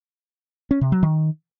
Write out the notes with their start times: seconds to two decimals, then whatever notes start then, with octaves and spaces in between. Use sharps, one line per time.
0.71 C#4
0.81 C3
0.92 F#3
1.03 D#3